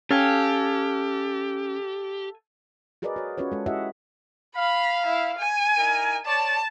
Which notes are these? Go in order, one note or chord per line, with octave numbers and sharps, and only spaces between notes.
C#4 G4 A4 F5 G#5
F#4 G#4 A#4 B4 D5 D#5
F#4 C#5
C#4 F4 F#4 B4 C#5
G#3 A4
E4 F#4 G4 D#5 E5 F#5
F5 B5
E4
G#5
D#4 E4 A#4
C#5 D5 A5